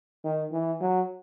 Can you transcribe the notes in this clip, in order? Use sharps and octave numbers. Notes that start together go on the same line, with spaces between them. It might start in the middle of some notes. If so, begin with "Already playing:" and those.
D#3
E3
F#3